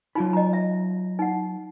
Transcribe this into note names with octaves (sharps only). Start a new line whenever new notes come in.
F#3 D#4 F4 B5
D#5 A#5
E5
D#4 F#5